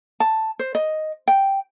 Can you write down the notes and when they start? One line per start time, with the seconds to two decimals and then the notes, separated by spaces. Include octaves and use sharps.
0.20 A5
0.59 C5
0.75 D#5
1.28 G5